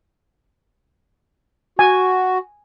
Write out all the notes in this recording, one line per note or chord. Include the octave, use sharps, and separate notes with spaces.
F#4 G#5